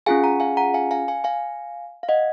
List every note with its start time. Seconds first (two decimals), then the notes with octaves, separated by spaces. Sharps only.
0.06 C#4 F4 G#4 F5 G#5
0.23 F#5 A#5
0.40 F5 G#5
0.57 F#5 A#5
0.74 F5 G#5
0.91 F5 G#5
1.08 F5 G#5
1.24 F5 G#5
2.03 F5
2.09 D#5 F#5